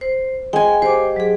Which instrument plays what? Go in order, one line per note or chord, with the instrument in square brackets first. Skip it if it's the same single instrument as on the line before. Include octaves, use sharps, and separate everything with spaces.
[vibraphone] C5
[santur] G#3 G#5 [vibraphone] G5
[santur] G4 [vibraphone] C5 D6
[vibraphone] F#3 G#4